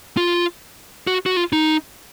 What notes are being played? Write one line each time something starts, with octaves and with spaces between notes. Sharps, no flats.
F4
F#4
F#4
F4
D#4